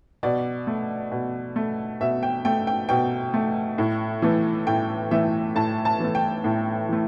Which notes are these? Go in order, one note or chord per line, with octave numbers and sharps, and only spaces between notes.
B2 D5
A3
B2
A3
B2 E5
G5
A3 G5
G5
B2 G5
A3
A2
E3 A3
A2 G5
E3 A3 E5
A2 A5
A5
E3 A3
G5
A2
E3 A3